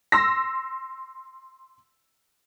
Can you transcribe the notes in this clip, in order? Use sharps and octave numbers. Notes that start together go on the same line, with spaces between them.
C6 E6 A#6